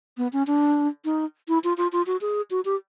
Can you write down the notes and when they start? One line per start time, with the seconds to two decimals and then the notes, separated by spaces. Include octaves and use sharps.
0.18 B3
0.33 C#4
0.47 D4
1.05 D#4
1.48 E4
1.64 F4
1.77 F4
1.92 F4
2.07 F#4
2.21 G#4
2.51 F#4
2.65 G4